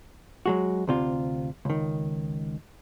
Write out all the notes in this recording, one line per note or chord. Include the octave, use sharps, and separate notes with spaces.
F#3 G#3 F#4
D2 C3 F4
C#2 D#3